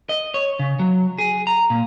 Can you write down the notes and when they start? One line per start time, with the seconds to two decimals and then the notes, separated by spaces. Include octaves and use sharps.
0.09 D#5
0.34 C#5
0.59 C#3
0.79 F#3
1.18 G#4
1.47 A#5
1.70 A#2